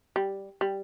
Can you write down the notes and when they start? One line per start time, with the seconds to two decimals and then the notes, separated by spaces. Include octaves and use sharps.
0.16 G3
0.61 G3